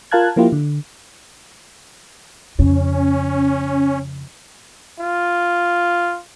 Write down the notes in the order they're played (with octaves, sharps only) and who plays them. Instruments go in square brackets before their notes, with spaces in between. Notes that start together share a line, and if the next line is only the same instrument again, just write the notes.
[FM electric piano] F4 A#4 F5 A5 F#6 G#6
F3 A#3 E4 F4 G4
D3
[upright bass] F2 C#3 [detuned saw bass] C#4
[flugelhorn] F4